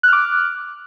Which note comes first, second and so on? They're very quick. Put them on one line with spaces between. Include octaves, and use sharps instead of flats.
F#6 F6 D6